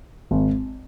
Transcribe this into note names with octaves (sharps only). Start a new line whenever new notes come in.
G#1